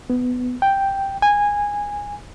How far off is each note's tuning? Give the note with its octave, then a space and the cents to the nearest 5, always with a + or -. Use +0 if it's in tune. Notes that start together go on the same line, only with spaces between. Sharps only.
B3 +10
G5 +0
G#5 -15